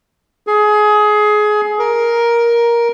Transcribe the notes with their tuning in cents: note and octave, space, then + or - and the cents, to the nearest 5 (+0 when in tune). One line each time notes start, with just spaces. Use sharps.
G#4 +20
A#4 +10